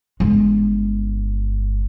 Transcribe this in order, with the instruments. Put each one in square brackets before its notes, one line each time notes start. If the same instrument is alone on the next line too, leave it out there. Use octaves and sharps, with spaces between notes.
[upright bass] G1 G#3